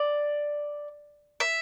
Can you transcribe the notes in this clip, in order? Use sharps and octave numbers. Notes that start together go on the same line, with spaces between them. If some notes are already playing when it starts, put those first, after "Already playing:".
Already playing: D5
E5